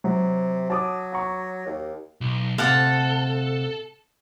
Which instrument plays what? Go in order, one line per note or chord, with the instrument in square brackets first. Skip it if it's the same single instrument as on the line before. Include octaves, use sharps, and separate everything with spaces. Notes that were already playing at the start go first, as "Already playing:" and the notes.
[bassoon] C3 [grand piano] F#3
[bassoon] F#3 [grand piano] A5 D6 D#6
[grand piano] F#5 A#5 C#6
[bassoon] D#2
[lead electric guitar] B1
[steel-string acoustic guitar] D2 C3 [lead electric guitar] A4 [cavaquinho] F5 F#5 A5